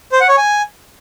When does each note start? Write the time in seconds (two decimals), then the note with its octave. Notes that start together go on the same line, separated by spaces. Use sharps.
0.12 C5
0.21 F#5
0.29 C#5
0.37 G#5